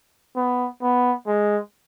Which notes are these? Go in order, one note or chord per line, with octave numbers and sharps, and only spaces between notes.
B3
B3
G#3